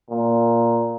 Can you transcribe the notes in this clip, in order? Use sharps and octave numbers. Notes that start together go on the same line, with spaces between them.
A#2